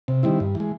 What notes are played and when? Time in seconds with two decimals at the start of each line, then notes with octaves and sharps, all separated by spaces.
0.08 C3
0.23 D#3 G3 C4 E4
0.40 G2
0.55 E3 G#3